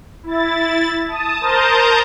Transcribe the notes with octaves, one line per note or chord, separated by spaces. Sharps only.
E4 A6
A5 D#6
A#4 C5 A5 A#5 D#6 G6